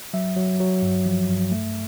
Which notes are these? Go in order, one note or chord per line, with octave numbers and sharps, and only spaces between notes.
F#3 E5
F#3
F#3
G2
F3
G2
A3 E5